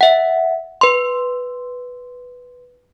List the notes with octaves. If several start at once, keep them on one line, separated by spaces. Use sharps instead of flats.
E5 F#5
B4 C6